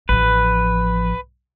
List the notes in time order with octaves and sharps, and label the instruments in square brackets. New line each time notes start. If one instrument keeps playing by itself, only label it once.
[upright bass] A1 F3 [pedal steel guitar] B4